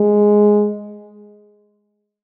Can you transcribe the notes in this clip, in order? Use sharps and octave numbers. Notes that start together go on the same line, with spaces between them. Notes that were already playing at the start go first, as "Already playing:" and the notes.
Already playing: G#3